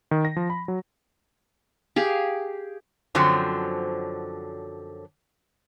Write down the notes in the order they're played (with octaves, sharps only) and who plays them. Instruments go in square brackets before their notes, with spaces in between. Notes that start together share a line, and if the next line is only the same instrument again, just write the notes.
[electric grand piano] D#3
A#6
F3
B5
F#3
[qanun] G4 G#4 F5
[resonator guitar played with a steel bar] F#2 D3 F3 F#3 C4